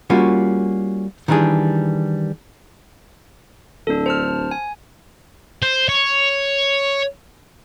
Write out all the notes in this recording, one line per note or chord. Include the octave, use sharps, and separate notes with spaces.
G3 A#3 C#4 F4 F#4
D#3 E3 G3 D4 G#4
D1 D4 A4
C5 A5 F6
G#5
C5
C#5